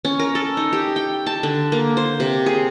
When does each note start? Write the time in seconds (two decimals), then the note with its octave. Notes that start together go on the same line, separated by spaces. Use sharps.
0.05 C#4
0.19 A#4
0.35 A4
0.57 D#4
0.73 G4
0.96 G5
1.26 A5
1.43 D3
1.72 A#3
1.97 C5
2.20 C3
2.46 G#4